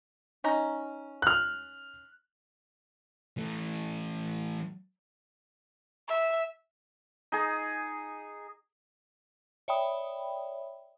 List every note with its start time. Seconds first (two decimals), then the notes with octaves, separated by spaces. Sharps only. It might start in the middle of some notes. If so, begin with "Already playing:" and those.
0.44 C#4 D#4 A#5
1.22 F6 F#6
3.37 E3 A3
6.08 E5
7.32 D#4 G#4
9.68 C#5 D5 E5 G5 B5 D#6